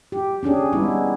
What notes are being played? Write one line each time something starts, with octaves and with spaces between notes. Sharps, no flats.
G4
C#4 D4 G4 G#4
G3 G#3 B3 D#4 E4